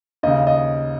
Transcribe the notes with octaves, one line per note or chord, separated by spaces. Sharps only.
D#2 C#3 D#5
D#5